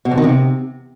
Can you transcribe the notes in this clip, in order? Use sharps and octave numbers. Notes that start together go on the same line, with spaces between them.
B2
F2
D#3
C3